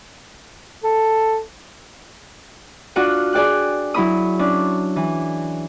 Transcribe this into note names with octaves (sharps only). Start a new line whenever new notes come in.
A4
D4 F4 F#4 F#5
G#4 D5 G5 F#6
F#3 E4 B5 D#6
C#4 D4
E3